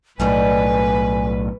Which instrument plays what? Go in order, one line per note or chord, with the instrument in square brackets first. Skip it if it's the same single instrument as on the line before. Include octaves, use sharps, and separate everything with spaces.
[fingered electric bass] B1 A2 [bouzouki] G3 G#3 D4 [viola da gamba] B4 [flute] G#5